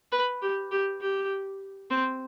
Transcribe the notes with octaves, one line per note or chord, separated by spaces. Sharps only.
B4
G4
G4
G4
C4